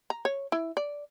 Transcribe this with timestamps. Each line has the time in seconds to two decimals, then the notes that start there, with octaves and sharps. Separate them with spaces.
0.10 A#5
0.25 C#5
0.52 E4
0.77 D5